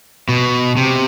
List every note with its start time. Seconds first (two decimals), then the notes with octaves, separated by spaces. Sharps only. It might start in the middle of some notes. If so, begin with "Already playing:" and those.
0.29 B2
0.77 C3